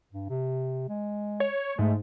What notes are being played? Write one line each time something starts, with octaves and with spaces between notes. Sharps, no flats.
G2
C3
G#3
C#5
G#2 A3